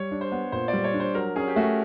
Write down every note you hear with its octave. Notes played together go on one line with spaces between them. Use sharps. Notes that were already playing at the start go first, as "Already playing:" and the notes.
Already playing: G3 C#5
D4
C5
B3
A#2 C5
D5
G3
C#5
D4
C5
F#3 A#4
C#4 G#4
G4
A3 F#4